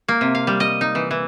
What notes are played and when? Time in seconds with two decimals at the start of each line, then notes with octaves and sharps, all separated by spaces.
0.08 A#3
0.21 C3
0.35 F5
0.47 G3
0.60 D#5
0.81 D#4
0.95 E3
1.11 E3